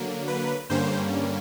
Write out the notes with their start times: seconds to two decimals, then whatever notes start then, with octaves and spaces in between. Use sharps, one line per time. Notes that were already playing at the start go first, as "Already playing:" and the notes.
Already playing: D3 F#3 A#3
0.28 B4
0.70 G2 D3 G3 A#3 C#4 C5